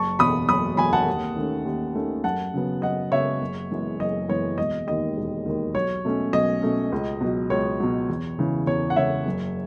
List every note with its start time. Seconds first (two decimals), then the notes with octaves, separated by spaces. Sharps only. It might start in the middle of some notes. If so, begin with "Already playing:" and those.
Already playing: F#1 A5 C#6
0.19 E2 B2 F#3 B5 D#6
0.48 F#1 B5 D#6
0.77 E2 B2 F#3 G#5 B5
0.93 F#5 A5
1.07 D#2
1.36 D#3 A3 C#4
1.65 D#2
1.95 D#3 A3 C#4
2.24 F#2 F#5 A5
2.54 C#3 F#3 B3
2.82 F#2 D#5 F#5
3.12 C#3 F#3 B3 C#5 E5
3.41 F#1
3.71 F#2 E3 G#3 B3
3.99 F#1 D#5
4.28 F#2 E3 G#3 B3 C#5
4.58 E1 D#5
4.87 D#2 D#3 D#5
5.17 E1
5.46 D#2 D#3
5.75 B1 C#5
6.05 B2 A3 C#4
6.33 B1 D#5
6.62 B2 A3 C#4
6.92 C#2
7.21 B2 F#3
7.50 C#2 C#5
7.80 B2 F#3
8.10 E2
8.39 C#3 E3
8.67 E2 C#5
8.90 F#5
8.96 C#3 E3 C#5 E5
9.26 F#1